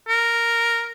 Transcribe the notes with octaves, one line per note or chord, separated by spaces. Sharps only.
A#4